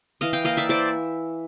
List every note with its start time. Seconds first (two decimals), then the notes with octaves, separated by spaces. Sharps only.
0.21 E3 D#5 F5
0.33 F5 G5
0.44 A#3 D#5 F5
0.57 D5 E5
0.69 E3 C5 D5